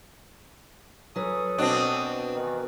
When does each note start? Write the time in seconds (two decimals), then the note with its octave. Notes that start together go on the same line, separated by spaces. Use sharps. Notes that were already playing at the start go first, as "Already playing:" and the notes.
1.16 F#3 C#4 A4 B4 D#6
1.58 B2 B3 C4 D4
2.35 D#3 E3